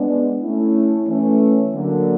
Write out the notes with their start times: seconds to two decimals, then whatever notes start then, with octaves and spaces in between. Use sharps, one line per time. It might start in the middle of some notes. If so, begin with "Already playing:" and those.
Already playing: G#3 B3 D4
0.41 A3 C#4 E4
1.08 E3 A3 C#4
1.75 D3 F#3 A#3